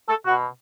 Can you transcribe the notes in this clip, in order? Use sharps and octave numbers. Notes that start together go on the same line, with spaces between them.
A4
B2 F#4